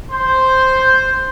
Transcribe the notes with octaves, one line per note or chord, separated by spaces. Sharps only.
C5